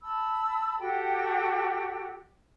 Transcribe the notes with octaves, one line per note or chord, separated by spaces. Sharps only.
A5 B5 E6
F#4 G4 A4 G5